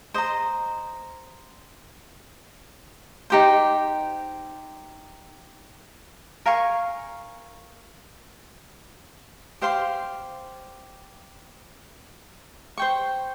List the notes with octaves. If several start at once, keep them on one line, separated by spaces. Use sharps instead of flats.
C5 D#5 A#5
D#4 G4 C5
A#4 F5 G#5 C#6
G4 C5 F5 C6
C5 G5 C#6